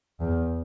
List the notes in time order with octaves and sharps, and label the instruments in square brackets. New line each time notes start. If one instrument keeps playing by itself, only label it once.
[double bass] E2